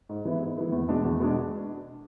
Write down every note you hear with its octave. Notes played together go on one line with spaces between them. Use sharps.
G#2
E3 B3 E4
G#2
E3 B3 E4
E2
B2 G#3 D4
E2
B2 G#3 D4